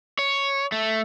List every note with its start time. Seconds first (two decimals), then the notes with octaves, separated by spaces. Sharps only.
0.19 C#5
0.72 A3